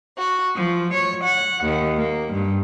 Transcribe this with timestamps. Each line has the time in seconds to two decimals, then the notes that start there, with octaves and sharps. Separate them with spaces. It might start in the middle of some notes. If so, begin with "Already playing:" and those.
0.16 F#4
0.55 F3
0.94 C#5
1.24 F#5
1.64 D#2
1.98 A#3
2.32 G2